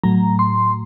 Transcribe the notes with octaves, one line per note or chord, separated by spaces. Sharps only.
A2 F#3 A3 A#5
C6